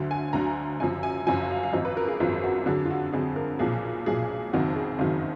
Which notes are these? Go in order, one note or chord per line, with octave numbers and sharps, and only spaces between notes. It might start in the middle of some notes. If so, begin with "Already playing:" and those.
Already playing: D2 D3 F#3
G#5
D2 D3 F#3 A#5
F#1 F#2 F3 G#5
G#5
F#1 F#2 F3 G#5
F5
F5
G#1 F#2 F3 D#5
B4
A#4
G#4
G#1 F#2 F3 F4
F#4
F2 D3 F#3 G#4
F4
F#4
F2 D3 F#3 G#4
A#4
B1 A#2 F3 G#4
B1 A#2 F3 G#4
F#1 F2 D#3 F#3 F#4
G#4
F#1 F2 D#3 F#3